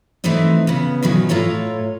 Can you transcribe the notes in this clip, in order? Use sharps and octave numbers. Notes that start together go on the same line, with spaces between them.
E3 F#3 A3 C4 D#4
C#3 B3
B2 D#3 E3 F#3
A2 F4 A4 C#5 A#5